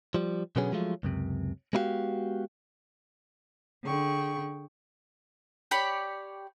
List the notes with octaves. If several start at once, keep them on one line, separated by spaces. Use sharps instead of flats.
F3 G3
B2 D3 F#3 B3 C#4 G#4
F3 F#3 G#3 A3 F4
C#2 F#2 C3
G#3 B3 E4 F#4 G4 F5
D3 G#4 G5 C#6
G4 C#5 D5 B5